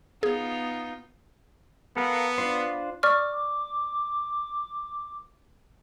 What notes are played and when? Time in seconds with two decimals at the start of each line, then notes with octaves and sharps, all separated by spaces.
0.23 B3 D#4 F4 G#4
1.97 B3 A4 A#4 F5
2.38 D4 F4 C5
3.03 D5 C#6 D6 F6